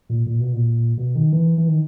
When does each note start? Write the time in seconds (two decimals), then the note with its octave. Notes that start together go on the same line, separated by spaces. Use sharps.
0.10 A#2
0.26 A#2
0.40 B2
0.53 A#2
0.98 B2
1.15 D#3
1.32 E3
1.58 E3
1.68 D#3